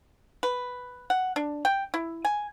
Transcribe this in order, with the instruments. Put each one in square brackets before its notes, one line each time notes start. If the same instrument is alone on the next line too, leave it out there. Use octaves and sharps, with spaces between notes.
[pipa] B4
F#5
D4
G5
E4
G#5